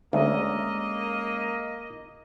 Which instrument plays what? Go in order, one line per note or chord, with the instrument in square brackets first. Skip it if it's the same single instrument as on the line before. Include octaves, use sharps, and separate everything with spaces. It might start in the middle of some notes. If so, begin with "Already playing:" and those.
[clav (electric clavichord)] D2 [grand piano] G#3 C#4 A4 [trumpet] A#3 [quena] D#5